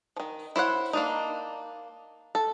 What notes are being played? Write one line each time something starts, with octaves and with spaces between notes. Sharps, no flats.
D#3 F3
E4 C5 C#5 F#5
A#3 D4 D#4
A4